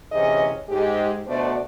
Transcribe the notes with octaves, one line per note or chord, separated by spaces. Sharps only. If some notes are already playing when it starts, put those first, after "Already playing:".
D2 C3 E3 C#4 G#4 D#5
G#2 G#3 G4
B2 A3 D4 F#4 C5 D5